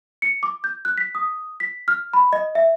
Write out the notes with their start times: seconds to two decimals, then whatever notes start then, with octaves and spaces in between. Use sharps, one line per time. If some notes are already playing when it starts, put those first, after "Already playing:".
0.22 C#7
0.43 D6
0.64 G6
0.85 F#6
0.98 B6
1.15 D#6
1.60 B6
1.88 F6
2.13 B5
2.33 D#5
2.55 E5